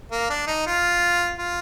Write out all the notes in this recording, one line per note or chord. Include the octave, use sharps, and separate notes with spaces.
A#3
D4
D#4
F4
F4